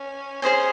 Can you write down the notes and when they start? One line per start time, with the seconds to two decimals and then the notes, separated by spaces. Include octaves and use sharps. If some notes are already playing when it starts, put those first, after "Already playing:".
Already playing: C#4
0.42 C#4 G#4 C5 D#5 G#5